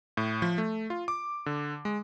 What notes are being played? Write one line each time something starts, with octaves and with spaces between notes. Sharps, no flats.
A2
F3
A3
F4
D6
D3
G#3